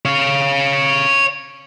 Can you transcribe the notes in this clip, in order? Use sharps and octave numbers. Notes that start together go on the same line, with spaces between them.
C#5 F5